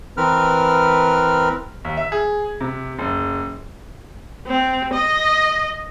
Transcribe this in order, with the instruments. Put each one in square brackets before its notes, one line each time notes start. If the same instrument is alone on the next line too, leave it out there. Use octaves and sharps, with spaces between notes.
[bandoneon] E3 C4 A#4 B4 F6
[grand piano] D#2
E5
G#4
C3
F#1
[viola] C4
D#5